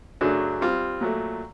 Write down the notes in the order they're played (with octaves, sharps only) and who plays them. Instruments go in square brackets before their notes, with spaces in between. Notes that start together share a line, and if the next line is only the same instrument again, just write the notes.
[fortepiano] F#2 C#3 F#3 A3 D4
G3 C4 F4
A#2 F#3 A3